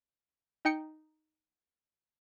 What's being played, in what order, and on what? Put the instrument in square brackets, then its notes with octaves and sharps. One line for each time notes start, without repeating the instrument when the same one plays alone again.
[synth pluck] D#4 G5 C#7